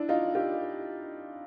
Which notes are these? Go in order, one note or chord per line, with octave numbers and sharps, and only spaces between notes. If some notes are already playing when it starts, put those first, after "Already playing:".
Already playing: D4 E4
D#4 F4
F4 G4